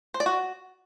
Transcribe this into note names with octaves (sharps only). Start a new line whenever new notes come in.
C5
D5
F#4